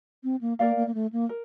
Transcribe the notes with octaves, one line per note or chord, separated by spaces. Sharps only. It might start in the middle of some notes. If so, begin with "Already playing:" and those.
C4
A#3
A#3 A#4 D5 F5
A#3
A#3
A3
A#3
A#4